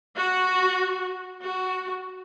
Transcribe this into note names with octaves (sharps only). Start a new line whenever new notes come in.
F#4
F#4